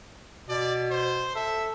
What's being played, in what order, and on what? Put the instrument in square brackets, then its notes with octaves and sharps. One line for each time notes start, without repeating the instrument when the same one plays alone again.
[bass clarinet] B2 [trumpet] D5
[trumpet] C5
[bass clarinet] A4 [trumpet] E5